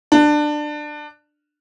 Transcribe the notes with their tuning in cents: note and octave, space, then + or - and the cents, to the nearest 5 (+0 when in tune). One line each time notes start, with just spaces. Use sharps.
D4 +20